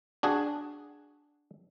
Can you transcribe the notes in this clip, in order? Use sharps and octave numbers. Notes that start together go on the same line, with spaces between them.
D4 F#4 G#4